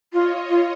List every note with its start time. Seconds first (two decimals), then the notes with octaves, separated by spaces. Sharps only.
0.12 F4 C#5 D#5
0.49 F4